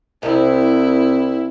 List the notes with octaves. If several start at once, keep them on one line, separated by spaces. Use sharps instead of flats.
C2 C3 E4